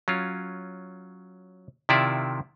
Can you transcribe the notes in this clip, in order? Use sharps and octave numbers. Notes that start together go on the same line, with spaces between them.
F#3 C#4 F4
C3 D#3 E4 F4 D5 E5